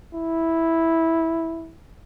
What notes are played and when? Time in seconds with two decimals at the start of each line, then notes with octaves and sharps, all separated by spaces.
0.14 E4